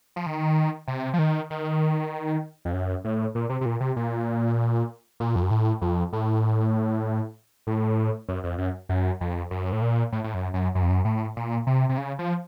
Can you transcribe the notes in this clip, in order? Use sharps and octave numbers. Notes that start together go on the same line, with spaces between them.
F3
D#3
C3
F3
D#3
D#3
F2
F#2
A2
A#2
C3
C3
A#2
C3
A#2
A#2
F2
F#2
A2
F2
A2
A2
F#2
F2
F#2
F#2
F2
F#2
A2
A#2
A2
A2
F#2
F#2
F#2
F2
F#2
A2
A#2
C3
C3
C#3
F3